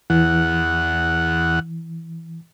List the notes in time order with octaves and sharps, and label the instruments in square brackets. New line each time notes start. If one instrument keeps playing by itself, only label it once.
[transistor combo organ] E2 F#5 [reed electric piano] E3